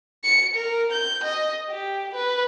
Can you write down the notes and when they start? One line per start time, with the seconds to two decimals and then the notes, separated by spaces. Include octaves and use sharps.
0.24 C#7
0.55 A#4
0.92 G6
1.24 D#5
1.70 G4
2.14 B4